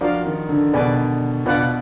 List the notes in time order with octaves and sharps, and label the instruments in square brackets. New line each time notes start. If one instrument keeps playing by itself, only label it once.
[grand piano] F3 [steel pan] D4 F#4 A#4 D5 F5
[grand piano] D#3
D3
[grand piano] B2 [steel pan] D4 G#4 B4 D5 G#5
[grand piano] B2 [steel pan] D4 F4 B4 D5 F#5